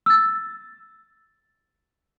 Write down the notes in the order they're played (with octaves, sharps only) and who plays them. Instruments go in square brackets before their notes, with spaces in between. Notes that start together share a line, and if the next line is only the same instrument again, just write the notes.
[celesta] E6 A6